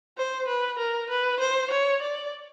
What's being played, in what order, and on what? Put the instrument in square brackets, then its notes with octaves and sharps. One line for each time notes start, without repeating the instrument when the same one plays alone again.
[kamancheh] C5
B4
A#4
B4
C5
C#5
D5